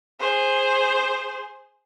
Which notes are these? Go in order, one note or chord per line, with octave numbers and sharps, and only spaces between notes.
G#4 C5